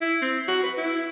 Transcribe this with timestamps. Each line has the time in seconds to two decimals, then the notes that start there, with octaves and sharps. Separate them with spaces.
0.02 E4
0.22 C4
0.48 F#4
0.64 B4
0.77 E4